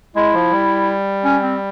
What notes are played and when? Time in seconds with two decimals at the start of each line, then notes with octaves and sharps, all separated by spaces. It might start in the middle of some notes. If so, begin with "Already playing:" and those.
0.15 G#3 E4
0.33 F3
0.52 G3
1.24 C#4
1.42 C4